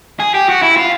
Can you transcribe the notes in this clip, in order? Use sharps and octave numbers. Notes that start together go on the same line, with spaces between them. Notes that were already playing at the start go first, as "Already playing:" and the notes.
G#4
G4
F#4
E4
F4